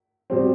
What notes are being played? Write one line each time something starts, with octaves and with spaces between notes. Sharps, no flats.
B2 G3 C4